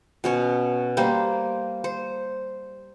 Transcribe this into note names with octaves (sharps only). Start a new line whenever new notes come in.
B2 C#4 C#5
G3 A#3 C5
C5